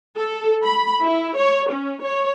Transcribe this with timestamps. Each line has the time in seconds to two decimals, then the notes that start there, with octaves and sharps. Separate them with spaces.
0.17 A4
0.64 B5
1.03 E4
1.38 C#5
1.73 C#4
2.04 C#5